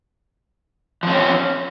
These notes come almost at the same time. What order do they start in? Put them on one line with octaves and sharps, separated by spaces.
F3 C4 C#4